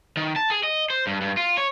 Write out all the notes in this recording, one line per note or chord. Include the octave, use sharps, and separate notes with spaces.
D#3
A5
G#4
D#5
C5
G2
G2
F4
C#5